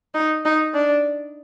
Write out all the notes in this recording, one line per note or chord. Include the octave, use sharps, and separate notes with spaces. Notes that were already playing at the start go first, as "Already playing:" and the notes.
D#4
D#4
D4